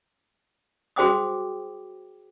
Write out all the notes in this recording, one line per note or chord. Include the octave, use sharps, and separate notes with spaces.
F#4 G#4 C5 G5 D6 D#6